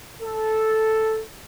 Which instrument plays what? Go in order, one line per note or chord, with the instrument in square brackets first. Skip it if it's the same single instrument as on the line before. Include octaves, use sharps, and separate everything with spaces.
[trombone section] A4